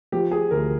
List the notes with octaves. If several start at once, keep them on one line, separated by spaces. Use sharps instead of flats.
F3 G4
G#4
D2 A#4